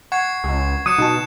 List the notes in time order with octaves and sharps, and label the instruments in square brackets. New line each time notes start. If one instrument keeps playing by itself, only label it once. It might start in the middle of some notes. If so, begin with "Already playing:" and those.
[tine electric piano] F#5 [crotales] C#6 G#6 C7
[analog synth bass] C#2
[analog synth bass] F#3 [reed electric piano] D#6 [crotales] F#6 C#7 E7
[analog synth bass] B2 [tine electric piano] D#4 F#4 A5